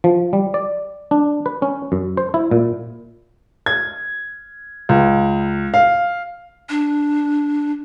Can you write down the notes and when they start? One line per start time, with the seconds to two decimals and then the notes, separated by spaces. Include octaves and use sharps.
0.04 F3
0.33 G3
0.54 D5
1.11 D4
1.46 B4
1.62 C#4
1.92 F#2
2.17 C5
2.34 E4
2.51 A#2
3.66 G#6
4.89 C#2
5.74 F5
6.69 D4